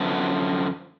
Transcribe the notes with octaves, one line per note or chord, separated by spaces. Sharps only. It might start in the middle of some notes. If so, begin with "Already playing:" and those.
Already playing: F#2 D3 F3 B3